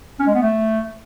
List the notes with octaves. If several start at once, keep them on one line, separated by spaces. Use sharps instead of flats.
C#4
G#3
B3
A3